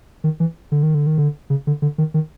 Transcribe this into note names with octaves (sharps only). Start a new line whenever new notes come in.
D#3
E3
D3
D#3
D3
D#3
D3
C#3
D3
D3
D#3
D#3